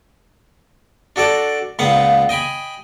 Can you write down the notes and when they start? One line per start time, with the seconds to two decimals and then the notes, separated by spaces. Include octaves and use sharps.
1.16 D4 F#4 A4 D5
1.79 C#2 A#2 B3 F5 F#5
2.29 D#5 G5 G#5 B5